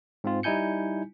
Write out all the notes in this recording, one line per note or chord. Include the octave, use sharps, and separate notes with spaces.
G#2 C4 F4
G3 D#4 E4 G#5 G6 C#7